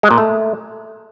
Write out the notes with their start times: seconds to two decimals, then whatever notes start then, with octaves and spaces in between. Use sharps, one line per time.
0.03 G#3
0.11 A#2
0.18 A3